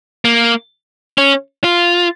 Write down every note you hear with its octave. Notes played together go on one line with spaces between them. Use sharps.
A#3
C#4
F4